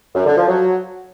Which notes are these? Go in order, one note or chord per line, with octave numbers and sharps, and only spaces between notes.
F#2
D3
F3
F#3